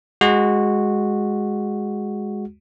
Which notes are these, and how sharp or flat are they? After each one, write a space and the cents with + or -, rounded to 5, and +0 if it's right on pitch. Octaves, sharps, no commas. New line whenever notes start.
G#3 -5 F#4 -5